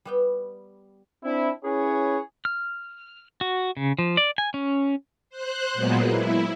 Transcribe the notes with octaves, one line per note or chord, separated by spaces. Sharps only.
G3 B3 G5
C4 D4 E4
C#4 E4 G#4 B4 C#5
F6
F#4
C#3
F3
D5
G#5
C#4
C5 F#6
A#2 F#3 G#3 A#3 B3
E4